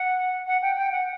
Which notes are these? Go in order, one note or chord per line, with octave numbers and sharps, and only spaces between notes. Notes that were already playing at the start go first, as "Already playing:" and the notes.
Already playing: F#5
F#5
G5
G5
F#5